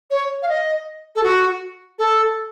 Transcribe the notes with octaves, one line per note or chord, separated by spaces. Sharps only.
C#5
F5
D#5
A4
F#4
A4